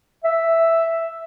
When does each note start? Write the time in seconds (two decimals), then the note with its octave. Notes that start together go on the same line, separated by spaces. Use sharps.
0.24 E5